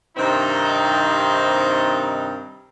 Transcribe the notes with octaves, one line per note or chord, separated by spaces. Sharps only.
G2 C3 D#3 C4 D#4